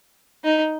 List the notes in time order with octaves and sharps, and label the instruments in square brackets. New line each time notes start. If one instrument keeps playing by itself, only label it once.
[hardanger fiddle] D#4